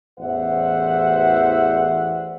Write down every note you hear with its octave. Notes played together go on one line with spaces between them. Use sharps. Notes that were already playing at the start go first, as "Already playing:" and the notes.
A1 E2 C5 D5 E5 F#5